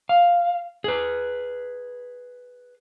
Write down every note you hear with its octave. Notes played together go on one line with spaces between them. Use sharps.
F5
G#4 B4